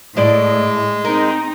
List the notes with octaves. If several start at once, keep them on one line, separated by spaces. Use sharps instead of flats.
A2 G#3 E4 D5 D#5
C4 D#4 A#4 D#5